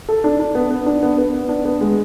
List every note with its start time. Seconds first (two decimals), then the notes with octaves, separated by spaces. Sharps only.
0.09 A4
0.24 D4
0.40 D4
0.55 B3
0.71 B3
0.86 D4
1.02 B3
1.18 B3
1.34 B3
1.49 D4
1.65 B3
1.81 G#3